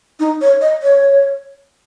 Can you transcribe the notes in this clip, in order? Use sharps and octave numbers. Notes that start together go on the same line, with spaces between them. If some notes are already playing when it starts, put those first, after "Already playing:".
D#4
C#5
D#5
C#5